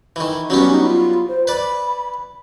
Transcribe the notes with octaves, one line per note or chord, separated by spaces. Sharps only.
D#3 E3
F#3 G3 B3 C#4
D#4
F4
C5
B4 D5 B5